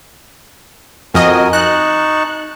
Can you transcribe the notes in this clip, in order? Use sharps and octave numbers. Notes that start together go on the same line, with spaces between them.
F2 F#4 A#4 D#5 G#5
D#4 A5 C#6 F#6